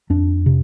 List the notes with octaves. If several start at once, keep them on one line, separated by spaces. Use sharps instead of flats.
F2 D4
C3